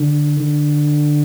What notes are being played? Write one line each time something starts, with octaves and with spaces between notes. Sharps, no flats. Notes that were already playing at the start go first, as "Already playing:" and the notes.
Already playing: D3
D3